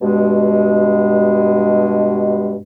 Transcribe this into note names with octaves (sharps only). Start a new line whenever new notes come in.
G2 B2 G#3